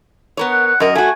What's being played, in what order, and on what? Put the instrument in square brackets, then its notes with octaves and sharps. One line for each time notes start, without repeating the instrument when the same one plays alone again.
[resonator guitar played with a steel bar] B3 A#4 C#5
[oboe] F#5
F#5
[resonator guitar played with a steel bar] F#2 A#4 [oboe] D#5
[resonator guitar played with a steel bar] A3 F#4 [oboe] G#5